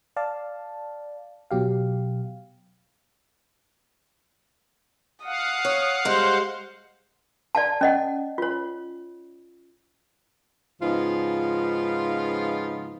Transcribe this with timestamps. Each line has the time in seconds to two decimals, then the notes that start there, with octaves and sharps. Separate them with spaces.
0.16 D5 F5 A5
1.51 B2 F#3 G4 F5
5.25 F5 F#5 D#6
5.65 C#5
6.05 G3 G#3 C5
7.55 D5 F5 A5
7.81 C#4 D#5 F#5
8.38 F4 C#5
10.82 G#2 C#3 F3 B3 D#4 F4